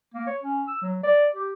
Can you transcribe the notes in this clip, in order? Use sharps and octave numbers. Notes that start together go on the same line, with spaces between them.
A#3
C#5
C#4
E6
F#3
D5
G4